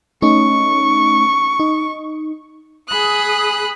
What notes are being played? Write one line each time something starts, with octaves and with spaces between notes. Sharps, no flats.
A3 C#4 D#4 C#6
D#4
G#4 B5 D#6 F#6